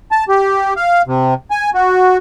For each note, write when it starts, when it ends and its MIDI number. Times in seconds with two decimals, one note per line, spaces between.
0.11 0.24 81
0.28 0.74 67
0.77 1.02 77
1.07 1.34 48
1.51 1.70 80
1.74 2.17 66